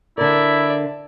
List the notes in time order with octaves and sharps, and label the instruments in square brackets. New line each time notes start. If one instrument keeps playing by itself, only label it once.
[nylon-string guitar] D3 A#4 [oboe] E4 [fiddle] D5 E5